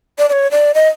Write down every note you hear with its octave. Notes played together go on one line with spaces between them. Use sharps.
D5
D5
C#5
D5
D#5